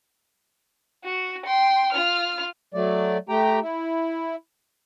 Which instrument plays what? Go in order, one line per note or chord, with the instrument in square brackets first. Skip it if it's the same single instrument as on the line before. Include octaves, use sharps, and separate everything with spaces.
[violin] F#4
G5 C6
F4 F6
[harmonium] F#3 A3 D5
A3 G4 G5 A#5
E4